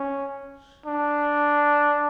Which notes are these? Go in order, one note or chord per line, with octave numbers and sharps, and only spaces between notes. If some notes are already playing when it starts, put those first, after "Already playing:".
Already playing: C#4
D4